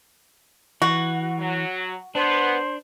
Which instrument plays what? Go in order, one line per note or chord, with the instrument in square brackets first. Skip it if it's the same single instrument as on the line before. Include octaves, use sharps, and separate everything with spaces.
[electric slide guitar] E3 [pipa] F#4
[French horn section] F#3
[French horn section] B3 [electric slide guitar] D4 [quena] C5